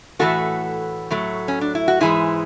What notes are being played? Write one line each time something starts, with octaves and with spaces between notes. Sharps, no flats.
A2 E3 A3 F#4 A4
A2 F#3 A3
C#4
D4
E4
F#4
G#2 E3 G#3 E4 G#4